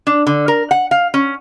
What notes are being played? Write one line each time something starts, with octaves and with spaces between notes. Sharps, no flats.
D4
D3
A#4
F#5
F5
C#4